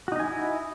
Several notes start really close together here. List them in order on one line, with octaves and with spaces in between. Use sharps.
F#4 D#4 D#5 G#5 E4